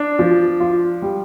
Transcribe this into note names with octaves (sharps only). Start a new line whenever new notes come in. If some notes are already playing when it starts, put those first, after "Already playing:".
Already playing: D4
F3
F4
G3